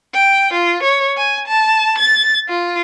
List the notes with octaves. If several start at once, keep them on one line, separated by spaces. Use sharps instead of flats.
G5
F4
C#5
G#5
A5
A6
F4